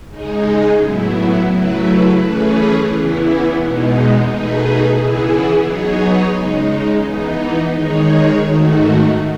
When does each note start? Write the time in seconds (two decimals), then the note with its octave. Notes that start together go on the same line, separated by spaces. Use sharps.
0.08 C#3 G#3 D#4 G#4
0.77 A2 F#3 B3 E4
1.47 C#3 F#3 A3 E4 B4
2.16 E3 A3 C#4 G#4 B4
2.86 E2 C#3 E3 B3 E4
3.55 E2 B2 G#3 B3 D#4
4.24 B2 A3 D#4 G#4 B4
4.93 C#3 E3 B3 E4 G#4
5.62 F#3 B3 D#4 G#4 C#5
6.32 C#3 G#3 D#4
7.02 E3 B3 D#4
7.71 D#3 G#3 D#4 G#4 C#5
8.40 G#2 D#3 A3 D#4 F#4